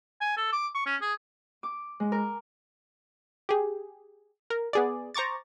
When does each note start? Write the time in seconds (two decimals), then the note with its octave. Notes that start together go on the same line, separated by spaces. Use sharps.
0.21 G#5
0.37 A4
0.53 D6
0.75 C#6
0.86 C#4
1.02 G#4
1.63 D6
2.00 G#3
2.12 A#4
3.49 G4 G#4
4.50 A#4
4.73 B3 G#4 D5
5.14 C5 A#5 C#6 D6 A6